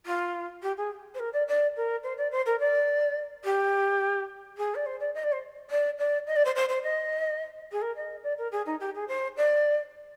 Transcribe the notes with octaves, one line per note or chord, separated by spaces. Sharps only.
F4
G4
G#4
C5
A#4
D5
D5
A#4
C5
D5
C5
A#4
D5
G4
G#4
D5
C5
D5
D#5
D5
C5
D5
D5
D#5
D5
C5
C5
C5
D#5
G#4
A#4
D#5
D5
A#4
G#4
D#4
G4
G#4
C5
D5